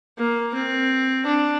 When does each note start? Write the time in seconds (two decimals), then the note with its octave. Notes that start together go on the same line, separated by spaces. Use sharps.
0.18 A#3
0.54 C4
1.26 D4